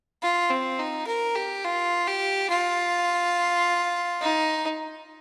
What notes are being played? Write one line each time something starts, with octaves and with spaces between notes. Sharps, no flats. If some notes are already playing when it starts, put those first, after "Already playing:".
F4
C4
D#4
A#4
G4
F4
G4
F4
D#4